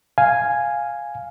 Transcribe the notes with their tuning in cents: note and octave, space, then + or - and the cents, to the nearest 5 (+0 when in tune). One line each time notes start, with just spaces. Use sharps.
F5 +0 G#5 +0